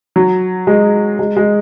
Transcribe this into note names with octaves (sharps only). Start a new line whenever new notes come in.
F#3
G#3
G#3
G#3